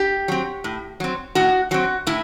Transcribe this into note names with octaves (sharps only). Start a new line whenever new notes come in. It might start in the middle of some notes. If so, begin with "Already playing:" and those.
Already playing: G4
F#3 C4
A2
F#3 C4
A2 F#4
F#3 C4 F#4
A2 E4